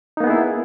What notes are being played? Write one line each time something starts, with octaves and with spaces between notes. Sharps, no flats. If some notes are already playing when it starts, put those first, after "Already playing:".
A#3 B3 D#4 E4 G#4